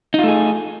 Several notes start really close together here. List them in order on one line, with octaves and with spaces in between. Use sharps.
D#4 F4 A3 G#4